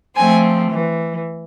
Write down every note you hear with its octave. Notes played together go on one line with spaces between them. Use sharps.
F3 A3 C4 G#5
E3